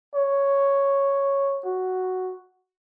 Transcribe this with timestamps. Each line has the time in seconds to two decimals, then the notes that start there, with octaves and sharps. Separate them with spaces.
0.15 C#5
1.65 F#4